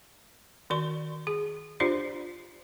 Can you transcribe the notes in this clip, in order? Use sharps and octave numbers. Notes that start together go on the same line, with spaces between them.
D#3 F#4 D5 C#6
G#4
D4 F4 G4 C5 D5